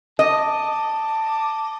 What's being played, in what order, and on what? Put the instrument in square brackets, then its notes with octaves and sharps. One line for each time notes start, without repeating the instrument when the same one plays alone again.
[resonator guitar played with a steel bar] D#5 [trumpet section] A5 D6